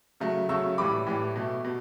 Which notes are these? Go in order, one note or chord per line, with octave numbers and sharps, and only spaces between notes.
C#3 F#3 A3
C#3 F#3 A3 C#6 E6
A2 E3 G3 B5 D6
A2 E3 G3
B2 A3
B2